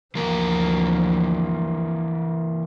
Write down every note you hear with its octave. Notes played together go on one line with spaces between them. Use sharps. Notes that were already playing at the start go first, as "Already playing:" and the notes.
D2 E3 F3 A#3 A#4